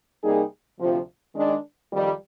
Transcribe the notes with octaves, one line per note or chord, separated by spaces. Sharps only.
C3 G3 A#3 D#4 G#4
D2 C3 F3
D#3 G#3 D4
F2 D#3 G3